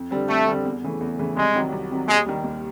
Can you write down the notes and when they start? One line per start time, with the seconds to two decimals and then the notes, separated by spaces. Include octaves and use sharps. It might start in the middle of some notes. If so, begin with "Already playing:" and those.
Already playing: F2
0.11 D3 G3 C4
0.29 F2 A3
0.47 D3 G3 C4
0.65 E2
0.84 C#3 E3 A3
1.01 E2
1.19 C#3 E3 A3
1.36 C2 G#3
1.54 C3 D#3 F#3
1.72 C2
1.91 C3 D#3 F#3
2.08 D#2 G#3
2.26 D#3 G3
2.44 D#2